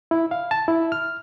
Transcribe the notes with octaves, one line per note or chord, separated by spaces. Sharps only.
E4
F5
A5
E4
F6